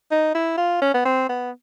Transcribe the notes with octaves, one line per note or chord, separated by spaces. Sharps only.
D#4
E4
F4
C#4
B3
C4
B3